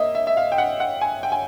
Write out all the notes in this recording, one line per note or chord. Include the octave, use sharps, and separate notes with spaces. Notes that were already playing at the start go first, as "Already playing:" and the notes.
Already playing: A#3 D#5 E5
E5
E5
F5
G5
F#5
F#5
G#5
G5
G#5